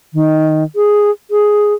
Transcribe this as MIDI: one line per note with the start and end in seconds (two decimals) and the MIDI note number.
0.14 0.64 51
0.76 1.11 68
1.31 1.74 68